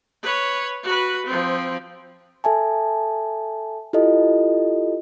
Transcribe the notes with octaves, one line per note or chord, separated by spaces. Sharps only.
B4 C#5
F#4 B4
F3 C4
A4 E5 G#5 A5
E4 F4 G4 A4 D#5